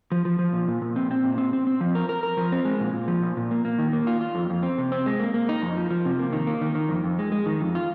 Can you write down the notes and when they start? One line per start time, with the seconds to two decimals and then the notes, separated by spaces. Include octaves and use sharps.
0.12 F3
0.25 F3
0.39 F3
0.53 A#2
0.68 A#2
0.82 A#2
0.96 C4
1.11 C4
1.24 A#2
1.38 C4
1.53 C4
1.67 C4
1.81 F3
1.95 A#4
2.09 A#4
2.23 A#4
2.37 F3
2.52 C4
2.65 G#3
2.80 A#2
2.93 A#2
3.08 F3
3.23 A#2
3.37 A#2
3.51 A#3
3.65 A#3
3.78 D#3
3.93 A#3
4.07 F4
4.21 F4
4.35 F2
4.50 F2
4.63 C4
4.78 C3
4.92 C4
5.06 G#3
5.19 A#3
5.34 A#3
5.49 D#4
5.62 F2
5.77 F3
5.91 F3
6.05 C3
6.19 A#3
6.33 D#3
6.47 A#3
6.61 D#3
6.75 D#3
6.89 F2
7.04 F2
7.19 G#3
7.32 G#3
7.46 D#3
7.61 F2
7.75 F4